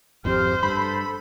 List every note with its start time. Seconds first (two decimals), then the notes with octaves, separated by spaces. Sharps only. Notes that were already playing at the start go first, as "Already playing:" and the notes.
0.25 G#1 F2 C4 G4 C5 F6
0.63 G2 A4 B5